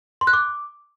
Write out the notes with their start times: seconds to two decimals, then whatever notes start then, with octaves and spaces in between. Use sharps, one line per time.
0.21 C6
0.27 F#6
0.33 D6